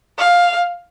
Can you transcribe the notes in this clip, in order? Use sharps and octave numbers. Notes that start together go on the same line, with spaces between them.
F5